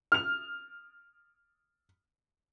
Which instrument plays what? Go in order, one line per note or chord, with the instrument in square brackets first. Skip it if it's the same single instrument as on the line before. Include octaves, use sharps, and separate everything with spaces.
[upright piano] F6 F7